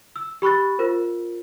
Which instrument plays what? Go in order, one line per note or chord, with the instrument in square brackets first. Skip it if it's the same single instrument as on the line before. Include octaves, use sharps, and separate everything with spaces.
[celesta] E6
G4 B5 C#6 F#6 A6
F4 A#4 C5